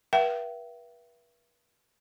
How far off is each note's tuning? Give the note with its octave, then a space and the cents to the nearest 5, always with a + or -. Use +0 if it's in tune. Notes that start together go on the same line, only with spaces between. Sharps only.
B4 -40 E5 +35 G5 -40